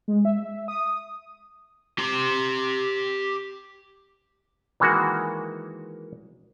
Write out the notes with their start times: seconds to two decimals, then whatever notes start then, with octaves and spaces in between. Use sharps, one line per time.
0.08 G#3
0.25 E5
0.68 D#6
1.98 G4 C6
4.80 D#3 E3 G#3 A#3 F#4